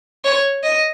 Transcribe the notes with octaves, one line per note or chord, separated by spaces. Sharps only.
C#5
D#5